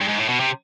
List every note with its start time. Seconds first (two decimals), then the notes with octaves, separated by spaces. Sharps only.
0.01 G2
0.08 G#2
0.18 A2
0.29 B2
0.40 C3